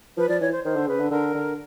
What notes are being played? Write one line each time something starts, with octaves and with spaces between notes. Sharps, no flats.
F3 B4
F3 D5
E3 C#5
C5
D#3 C5
D3
C#3 B4
D3
D3 A#4
D3